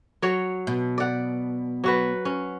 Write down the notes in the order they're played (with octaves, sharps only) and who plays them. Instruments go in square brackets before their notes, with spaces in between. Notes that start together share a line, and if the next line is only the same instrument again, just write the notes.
[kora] F#3 C#5
[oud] B2
[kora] D5 F#5
F#3 F#4 B4
C#4